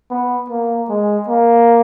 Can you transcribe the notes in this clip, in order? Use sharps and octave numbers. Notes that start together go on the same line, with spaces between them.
B3
A#3
G#3
A#3